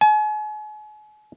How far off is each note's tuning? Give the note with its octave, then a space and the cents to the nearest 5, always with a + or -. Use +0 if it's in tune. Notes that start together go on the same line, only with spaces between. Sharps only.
G#5 +40